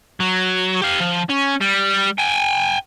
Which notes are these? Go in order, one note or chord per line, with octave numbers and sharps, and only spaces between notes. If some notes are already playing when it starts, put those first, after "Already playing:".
F#3
G4 F5
F3
C#4
G3
G5 G#5